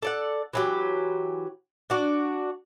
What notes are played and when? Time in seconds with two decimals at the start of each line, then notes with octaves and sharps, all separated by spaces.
0.03 A4 D5 F#5
0.53 E3 F#3 G4
1.90 D4 F#4 D5